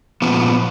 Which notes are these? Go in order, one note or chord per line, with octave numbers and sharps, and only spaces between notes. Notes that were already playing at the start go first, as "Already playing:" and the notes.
A#2 F3 B3